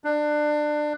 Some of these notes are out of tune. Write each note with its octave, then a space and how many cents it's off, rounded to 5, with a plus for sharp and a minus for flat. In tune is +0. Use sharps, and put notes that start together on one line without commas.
D4 +25